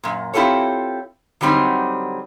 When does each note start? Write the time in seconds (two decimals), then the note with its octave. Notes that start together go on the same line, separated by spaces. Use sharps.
0.04 F#2 A#2
0.33 C4 E4 F4 G4 A4 C#5
1.41 D3 F#3 G3 C4 D#4